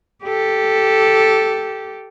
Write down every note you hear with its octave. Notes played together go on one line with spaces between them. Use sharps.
G4 A4